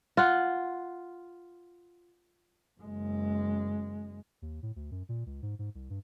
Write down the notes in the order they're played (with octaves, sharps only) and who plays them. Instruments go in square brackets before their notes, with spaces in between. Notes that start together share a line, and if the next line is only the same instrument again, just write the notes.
[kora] F4 F#5
[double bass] F#1 G#3
[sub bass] D#2
A2
D2
F#2
A#2
C#2
G#2
G#2
C2
G2